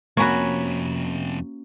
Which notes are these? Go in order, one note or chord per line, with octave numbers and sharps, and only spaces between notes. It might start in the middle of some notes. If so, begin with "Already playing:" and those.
F2 C3 A#3 C#4 F#4 C#5 B5